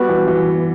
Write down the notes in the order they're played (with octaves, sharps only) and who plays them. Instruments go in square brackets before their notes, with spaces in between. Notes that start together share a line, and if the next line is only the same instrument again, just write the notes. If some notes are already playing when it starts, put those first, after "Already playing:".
Already playing: [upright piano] G3 [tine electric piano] B3 F#4 B4
[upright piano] E3
E3